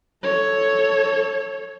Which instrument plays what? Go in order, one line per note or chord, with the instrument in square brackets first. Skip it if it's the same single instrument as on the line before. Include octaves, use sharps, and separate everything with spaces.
[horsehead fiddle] A4 C#5